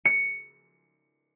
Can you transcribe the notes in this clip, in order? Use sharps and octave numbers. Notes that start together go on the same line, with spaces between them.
C#7